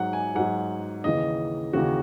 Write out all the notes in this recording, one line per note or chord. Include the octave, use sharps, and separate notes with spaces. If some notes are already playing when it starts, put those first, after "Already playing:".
Already playing: G#2 F#3 F#5
G#5
G#2 F#3 F#5
D#2 C#3 E3 D#5
D#2 C#3 E3 F#4